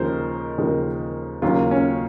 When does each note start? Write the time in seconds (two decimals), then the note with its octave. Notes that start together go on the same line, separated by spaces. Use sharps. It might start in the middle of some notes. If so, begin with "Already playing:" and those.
Already playing: D#2 C#3 F3 G#3 A#4 C5
0.58 D#2 C#3 F3 G#3
1.42 D#2 C#3 F#3 A#3 F4
1.71 C#4